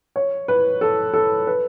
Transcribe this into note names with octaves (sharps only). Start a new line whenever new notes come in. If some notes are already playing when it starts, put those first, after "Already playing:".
C#5
B4
A4
A4
B4